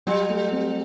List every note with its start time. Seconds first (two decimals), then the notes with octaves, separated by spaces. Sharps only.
0.07 F#3 G3
0.29 A3
0.52 C4